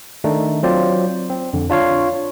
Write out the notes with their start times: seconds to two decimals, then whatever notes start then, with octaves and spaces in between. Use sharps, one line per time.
0.24 D#3 A3 D4 D#4
0.63 F#3 C4 F4 C5 D5
1.30 C4
1.53 F2 D3
1.69 D4 F4 C#5 F5